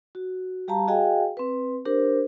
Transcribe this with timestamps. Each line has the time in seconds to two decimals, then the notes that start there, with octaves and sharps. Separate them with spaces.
0.15 F#4
0.68 G3 G4 F5 A5 A#5
0.88 F#4 G#4 D#5 F5 G5 G#5
1.37 C4 B4
1.85 D4 G4 A#4 C5